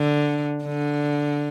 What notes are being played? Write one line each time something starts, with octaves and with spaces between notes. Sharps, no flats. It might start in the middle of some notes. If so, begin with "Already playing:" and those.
Already playing: D3
D3